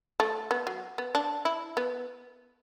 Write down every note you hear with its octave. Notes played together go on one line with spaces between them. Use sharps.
A3
B3
F#3
B3
D4
E4
B3